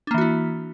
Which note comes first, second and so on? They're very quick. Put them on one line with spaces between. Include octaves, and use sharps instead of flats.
D4 A#3 E3 F#4 E4